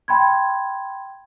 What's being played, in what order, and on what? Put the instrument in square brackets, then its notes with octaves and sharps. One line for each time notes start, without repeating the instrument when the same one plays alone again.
[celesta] G5 B5 C6 G#6